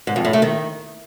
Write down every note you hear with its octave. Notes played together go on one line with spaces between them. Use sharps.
G#2
F2
A2
A3
D#3